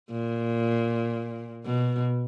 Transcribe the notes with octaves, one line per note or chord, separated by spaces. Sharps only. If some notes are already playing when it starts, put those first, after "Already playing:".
A#2
B2